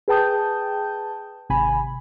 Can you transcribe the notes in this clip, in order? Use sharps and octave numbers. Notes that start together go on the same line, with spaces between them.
G#4 B4 G5 A5 D#6 G6
G#1 C3 G#5 B5